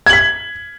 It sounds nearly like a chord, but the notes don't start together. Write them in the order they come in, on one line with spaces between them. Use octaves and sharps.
G#6 F#7 B6